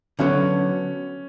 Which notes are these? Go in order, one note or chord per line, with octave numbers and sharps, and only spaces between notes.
D3 F#3 B3 C#4